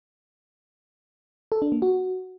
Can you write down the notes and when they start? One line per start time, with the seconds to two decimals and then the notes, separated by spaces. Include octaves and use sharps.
1.52 A4
1.62 D4
1.72 A#3
1.82 F#4